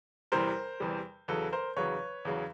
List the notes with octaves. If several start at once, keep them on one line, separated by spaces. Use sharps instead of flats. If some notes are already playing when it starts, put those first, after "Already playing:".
E2 C3 E3 G3 A#4 C5
E2 C3 E3 G3
E2 C#3 F#3 A4 B4
A#4 C5
E2 C#3 F#3 B4 C#5
E2 C#3 F#3